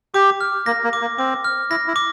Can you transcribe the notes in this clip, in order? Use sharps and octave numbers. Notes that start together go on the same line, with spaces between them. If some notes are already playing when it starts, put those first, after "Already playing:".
G4 D6
F6
A#3 A#6
A#3
D6
A#3
C4 D6
F6
E4 A#6
E4
D6